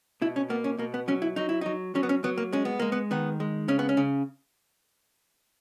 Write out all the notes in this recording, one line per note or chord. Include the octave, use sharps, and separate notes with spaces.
B2 E4
C#4
A#3 B3
C#4
B2 A#3
B3
F#3 C#4
E4
F#3 D#4
E4
F#3 D#4
F#3 C#4
B3
C#4
F#3 B3
A#3
G#3 C#4
B3
G#3 A#3
B3
D#3 B3
G#3
C#3 C#4
B3
C#4
C#3